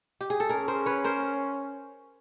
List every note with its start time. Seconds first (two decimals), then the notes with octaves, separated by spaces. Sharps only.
0.21 G4
0.30 G#4
0.40 A4
0.49 C#4 G#4 A#4
0.68 A#4 C5
0.86 B4 C#5
1.04 A#4 C5